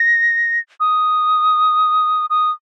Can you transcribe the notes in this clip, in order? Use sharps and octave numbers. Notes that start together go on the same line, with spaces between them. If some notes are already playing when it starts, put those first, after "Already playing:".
Already playing: A#6
D#6
D#6